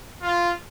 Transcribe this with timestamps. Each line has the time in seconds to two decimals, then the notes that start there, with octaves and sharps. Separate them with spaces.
0.22 F4